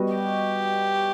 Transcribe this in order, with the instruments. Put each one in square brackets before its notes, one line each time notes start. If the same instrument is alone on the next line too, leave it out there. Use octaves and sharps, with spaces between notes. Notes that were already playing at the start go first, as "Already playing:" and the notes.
Already playing: [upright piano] G3 B3 F#4 D#5
[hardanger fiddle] G4